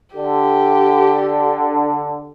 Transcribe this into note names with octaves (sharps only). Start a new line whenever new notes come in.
D3 G4